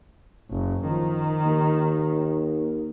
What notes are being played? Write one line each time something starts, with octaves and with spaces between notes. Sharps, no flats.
F#1
D#3 F3
D#2